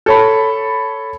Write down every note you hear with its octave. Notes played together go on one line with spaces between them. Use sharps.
A4 C#5 B5